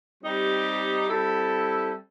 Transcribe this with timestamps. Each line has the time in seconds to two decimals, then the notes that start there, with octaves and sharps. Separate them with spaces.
0.23 G3 C4 D#4 G4
1.09 G3 C4 E4 A4